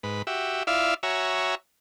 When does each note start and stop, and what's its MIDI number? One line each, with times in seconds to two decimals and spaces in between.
0.03 0.22 44
0.03 0.22 71
0.27 0.63 66
0.27 0.63 67
0.27 0.63 76
0.67 0.94 64
0.67 0.94 65
0.67 0.94 74
0.67 0.94 76
0.67 0.94 77
1.03 1.55 66
1.03 1.55 73
1.03 1.55 76
1.03 1.55 80
1.03 1.55 82